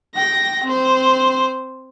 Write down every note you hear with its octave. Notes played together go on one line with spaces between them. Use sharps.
G5 A#6
C4 C5